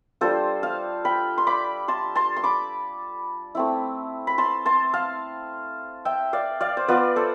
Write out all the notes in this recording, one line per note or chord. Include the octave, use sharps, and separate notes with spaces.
G3 D4 F4 A4 C5
F5 A5
G5 B5
C6
B5 D6
A5 C6
A5 C6
C6
B5 D6
A3 C4 E4
B5
A5 C6
A5 C6
F5 A5
E5 G5
D5 F5
D5 F5
C5
B3 F4 B4 D5
A4 C5